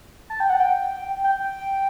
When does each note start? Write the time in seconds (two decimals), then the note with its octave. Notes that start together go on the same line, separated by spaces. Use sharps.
0.30 A5
0.40 G5
0.50 F#5
0.60 G5
1.24 G5